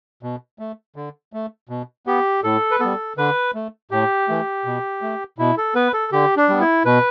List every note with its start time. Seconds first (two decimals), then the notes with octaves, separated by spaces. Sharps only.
0.23 B2
0.59 A3
0.96 D3
1.33 A3
1.69 B2
2.06 B3 G4
2.44 A2 A4
2.71 B4
2.80 G3 B3 A4
3.17 D3 B4
3.55 A3
3.91 A2 G4
4.28 E3 A3
4.65 B2
5.02 A3
5.39 B2 E4
5.58 A4
5.75 B3 B4
5.94 A4
6.12 D3 G4
6.37 D4
6.49 G3 B3
6.61 E4
6.85 B2 B4